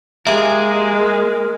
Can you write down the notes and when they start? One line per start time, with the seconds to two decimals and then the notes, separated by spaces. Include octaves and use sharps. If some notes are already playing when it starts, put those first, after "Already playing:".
0.27 G#3 A#3 G4 G#4 E5
0.96 A#4